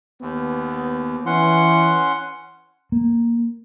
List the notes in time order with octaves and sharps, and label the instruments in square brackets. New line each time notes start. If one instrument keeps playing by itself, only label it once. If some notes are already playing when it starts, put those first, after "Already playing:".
[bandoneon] D#2 [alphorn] B3
[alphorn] E3 [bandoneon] C#4 F#5 C6
[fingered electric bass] A#3